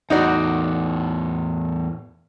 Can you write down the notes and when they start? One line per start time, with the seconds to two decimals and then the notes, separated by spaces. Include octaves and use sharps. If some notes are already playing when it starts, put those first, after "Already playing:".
0.10 E2 A2 D#4 F#4 D5